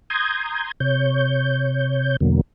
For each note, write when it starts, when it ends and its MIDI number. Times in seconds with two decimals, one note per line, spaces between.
0.10 0.71 82
0.10 0.71 84
0.10 0.71 87
0.10 0.71 91
0.10 0.71 92
0.80 2.16 48
0.80 2.16 73
0.80 2.16 91
2.20 2.41 40
2.20 2.41 47
2.20 2.41 50
2.20 2.41 54
2.20 2.41 58